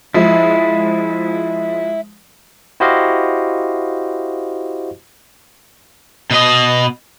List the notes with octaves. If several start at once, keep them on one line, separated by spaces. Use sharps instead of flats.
F3 G#3 E4
E4 F#4 G4 C5 D#5 F5
B2 D#5